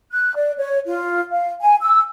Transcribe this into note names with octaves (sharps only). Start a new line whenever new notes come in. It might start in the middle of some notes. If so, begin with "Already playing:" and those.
F#6
D5
C#5
F4
F5
G#5
E6